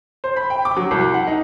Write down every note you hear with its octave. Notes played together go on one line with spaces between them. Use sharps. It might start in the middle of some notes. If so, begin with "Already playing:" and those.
C5
B5
G5
D6
F#3
C2
F#5
D#4